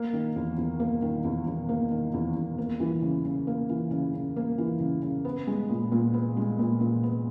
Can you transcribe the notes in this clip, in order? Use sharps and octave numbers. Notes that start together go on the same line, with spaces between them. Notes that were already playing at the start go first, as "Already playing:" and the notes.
Already playing: A#3
D#3
E2
E2
A#3
D#3
E2
E2
A#3
D#3
E2
E2
A#3
E3
C#3
C#3
A#3
E3
C#3
C#3
A#3
E3
C#3
C#3
B3
G#3
A#2
A#2
B3
G#3
A#2
A#2
B3